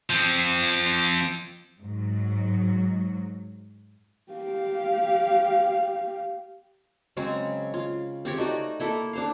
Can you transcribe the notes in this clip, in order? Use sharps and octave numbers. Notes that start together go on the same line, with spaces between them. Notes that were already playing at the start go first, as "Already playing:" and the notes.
F3 C4
G#2 F#3
G4 F5
C#3 F#3 G#3 C4
F4
C4 G4 C#5
A3 D#4 F#4 D5
A#3 E4 A4
D4 C5 F5